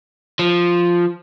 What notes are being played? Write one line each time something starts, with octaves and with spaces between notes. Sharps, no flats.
F3